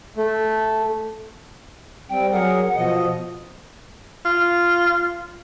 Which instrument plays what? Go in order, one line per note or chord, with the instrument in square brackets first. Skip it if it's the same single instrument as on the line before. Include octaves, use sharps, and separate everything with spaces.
[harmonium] A3
[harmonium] G3 C4 [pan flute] G5
[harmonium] F#3 G#4 A#4 [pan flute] F#5
[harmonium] B2 F3 D#5
[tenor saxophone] F4